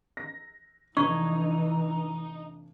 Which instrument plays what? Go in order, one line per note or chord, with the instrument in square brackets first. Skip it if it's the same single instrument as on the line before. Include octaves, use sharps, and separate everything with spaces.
[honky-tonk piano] A#6
[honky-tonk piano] F1 D4 G#6 [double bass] E3 [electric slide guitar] D#4 [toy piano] C#6